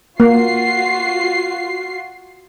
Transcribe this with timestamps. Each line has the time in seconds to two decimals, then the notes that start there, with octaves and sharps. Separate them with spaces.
0.20 A#3 F4 F#4 C7